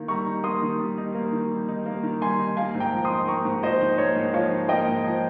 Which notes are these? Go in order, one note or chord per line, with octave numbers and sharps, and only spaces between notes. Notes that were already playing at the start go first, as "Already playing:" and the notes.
Already playing: D#3 A#3
G3 A#5 C#6
D#4
A#3 C6 D#6
D#3
G3
D#4
A#3
D#3
G3
D#4
A#3
D#3
G3 G#5 C6
D#4
A#3 F5 G#5
G#2
G5 A#5
F3
C6 D#6
D#4
A#3 A#5 C#6
G#2
F3 C5 D#5
D#4
A#3 C#5
G#2
F3 C#5 F5
D#4
A#3 D#5 G5
G#2
F3